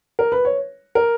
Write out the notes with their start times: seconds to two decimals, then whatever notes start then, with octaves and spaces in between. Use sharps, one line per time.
0.19 A#4
0.32 B4
0.45 C#5
0.95 A#4